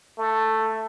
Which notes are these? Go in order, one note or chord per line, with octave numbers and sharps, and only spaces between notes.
A3